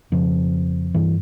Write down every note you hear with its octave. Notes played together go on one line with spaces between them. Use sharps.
F2 C#3 F3
G2 E3